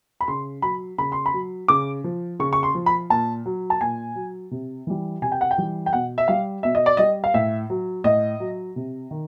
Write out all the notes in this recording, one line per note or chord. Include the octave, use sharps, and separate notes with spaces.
B5
C#3 C6
F#3 B5
C#3 B5
C6
B5
F#3
C#3 D6
F3
C#3 C#6
C#6
C6
F3
B5
A#2 A5
F#3
A5
A#2 G#5
F#3
C3
E3 G3
C3 G#5
G5
F#5
G5
E3 G3
G5
B2 F#5
E5
G3 F5
B2 E5
D#5
D5
G3 D#5
F5
A2 E5
F#3
A2 D#5
F#3
C3
D#3